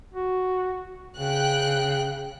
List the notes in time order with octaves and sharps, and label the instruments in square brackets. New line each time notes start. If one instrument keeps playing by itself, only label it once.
[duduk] F#4
[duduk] C#3 [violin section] G5 F#6